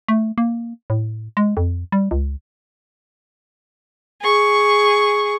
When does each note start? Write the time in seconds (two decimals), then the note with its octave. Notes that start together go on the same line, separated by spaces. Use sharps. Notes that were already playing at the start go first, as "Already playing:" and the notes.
0.08 A3
0.38 A#3
0.90 A2
1.37 G#3
1.57 F2
1.92 G3
2.11 C#2
4.21 G#4 C#6